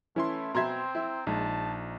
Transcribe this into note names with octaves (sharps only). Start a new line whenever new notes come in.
E3 A3 C#4 E4 C6
B2 C4 E5 A#5 C6 G#6
E4
A#1 G#3 D#4 A5